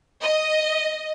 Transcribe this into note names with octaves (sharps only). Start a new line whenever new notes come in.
D#5